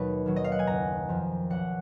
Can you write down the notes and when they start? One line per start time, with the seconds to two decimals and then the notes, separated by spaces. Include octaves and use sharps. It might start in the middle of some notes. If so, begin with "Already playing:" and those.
Already playing: D#2 B2 F#3 B4 D#5
0.26 D#3 F#3
0.36 D#5
0.44 F5
0.52 F#5
0.59 G#5
0.67 F#1 A#5
1.09 F2 F3
1.50 B1 F#5